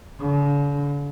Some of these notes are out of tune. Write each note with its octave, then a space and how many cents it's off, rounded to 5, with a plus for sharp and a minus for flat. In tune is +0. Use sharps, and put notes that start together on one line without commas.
D3 -45